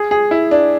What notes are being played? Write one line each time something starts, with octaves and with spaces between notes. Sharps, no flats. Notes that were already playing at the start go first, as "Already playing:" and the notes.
Already playing: G#4
G#4
E4
D4